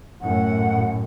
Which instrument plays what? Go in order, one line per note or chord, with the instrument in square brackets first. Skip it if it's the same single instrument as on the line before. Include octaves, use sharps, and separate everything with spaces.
[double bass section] F#2 A2 [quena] F#5